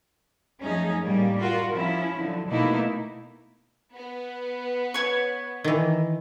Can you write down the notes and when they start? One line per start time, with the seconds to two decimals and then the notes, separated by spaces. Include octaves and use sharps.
0.62 F#2 F3 A3 C#4 D#4 G#4
1.01 A2 G3 A#3
1.38 F4 F#4 A#4
1.73 F3 C#4 E4
2.17 D3 F3 F#3
2.49 B2 A3 A#3 D#4 E4
3.94 B3
4.94 C#5 C#6
5.64 D#3 E3